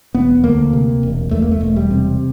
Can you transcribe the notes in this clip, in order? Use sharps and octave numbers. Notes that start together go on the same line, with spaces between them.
E1 B3
D2 A#3
C3
E1
E2 A3
A#3
A3
E1
G3
C3